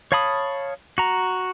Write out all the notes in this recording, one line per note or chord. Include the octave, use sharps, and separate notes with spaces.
C#5 F5 A5 B5 D#6
F#4 A#5